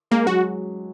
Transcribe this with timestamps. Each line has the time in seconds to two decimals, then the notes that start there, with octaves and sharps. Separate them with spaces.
0.11 G#3 A#3
0.26 F#3 F#4